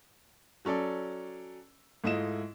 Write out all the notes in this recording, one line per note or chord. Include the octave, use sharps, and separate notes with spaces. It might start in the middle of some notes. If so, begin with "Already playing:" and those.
F#3 C#4 A4 D5
G#2 A3 E4 F4 D#5 E7